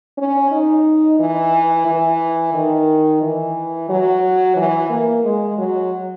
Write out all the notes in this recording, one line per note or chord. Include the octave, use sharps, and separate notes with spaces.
C#4
D#4
E3
E3
D#3
E3
F#3
E3
A#3
G#3
F#3